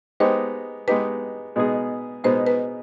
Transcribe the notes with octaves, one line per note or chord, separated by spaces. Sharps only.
G#3 B3 D#4 G4 C5
G#3 B3 D#4 G4 B4
B2 G#3 B3 D#4 G#4
B2 G#3 B3 D#4 G#4 C5
B4